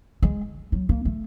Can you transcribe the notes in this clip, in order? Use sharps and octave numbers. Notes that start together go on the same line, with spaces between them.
G#3
F#3
A#3
A3